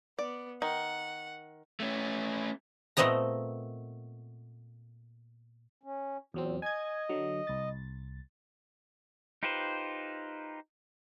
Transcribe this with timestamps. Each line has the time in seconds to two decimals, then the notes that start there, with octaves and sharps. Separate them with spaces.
0.19 B3 D5
0.62 D#3 F#5
1.80 A3 C#4
2.97 A#2 A3 B3 C4 D#5 A#5
5.83 C#4
6.34 E2 A#2 F#3 C4
6.62 D#5 G#5 G#6
7.09 D3 F#3
7.47 C2 A6
9.43 D#4 F4 G4 B4 C5